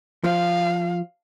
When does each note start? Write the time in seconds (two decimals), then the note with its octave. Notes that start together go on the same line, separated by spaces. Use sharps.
0.24 F3 F5